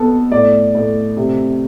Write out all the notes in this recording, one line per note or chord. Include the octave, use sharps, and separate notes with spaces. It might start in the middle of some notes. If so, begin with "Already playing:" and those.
Already playing: B2 B3 A4
A2 D5
A2
C3